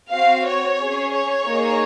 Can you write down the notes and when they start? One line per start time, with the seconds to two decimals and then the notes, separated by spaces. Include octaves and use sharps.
0.11 C4 F#4 F5
0.46 C#5
0.80 C#4 G#4
1.13 C#5
1.47 A#3 D#4 G#4